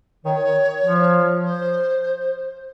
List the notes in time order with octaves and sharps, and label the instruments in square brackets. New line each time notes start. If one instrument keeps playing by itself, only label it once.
[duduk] D#3 [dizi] C#5
[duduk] F3
[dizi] C5